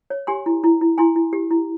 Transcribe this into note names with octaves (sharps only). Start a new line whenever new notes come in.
C#5
G4 G#5 C6
E4
E4
E4
E4 G#5 C6
E4
G4
E4